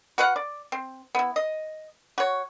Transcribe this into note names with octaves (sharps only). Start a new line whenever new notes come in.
F#4 B4 F5 F#5
D5
C4
B3 E4
D#5
F#4 C#5